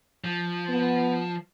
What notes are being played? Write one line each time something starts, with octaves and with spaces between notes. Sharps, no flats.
F3
B3